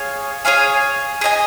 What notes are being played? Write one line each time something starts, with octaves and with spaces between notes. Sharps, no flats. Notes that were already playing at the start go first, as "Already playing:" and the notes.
Already playing: G#4 C#5 F5
G#4 C#5 F5 G#5
G#4 D#5 G#5